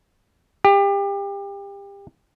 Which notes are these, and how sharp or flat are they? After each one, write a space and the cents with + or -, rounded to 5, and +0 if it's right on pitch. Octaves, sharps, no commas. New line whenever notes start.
G4 +30